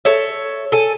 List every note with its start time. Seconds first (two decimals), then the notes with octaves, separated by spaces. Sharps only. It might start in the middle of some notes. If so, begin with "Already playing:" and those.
0.05 A4 C#5 E5
0.72 A4 G#5